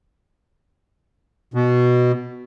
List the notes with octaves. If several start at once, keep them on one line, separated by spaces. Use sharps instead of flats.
B2